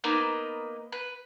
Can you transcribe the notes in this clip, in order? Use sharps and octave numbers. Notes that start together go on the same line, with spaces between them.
A#3 B3 D#4 B4
B4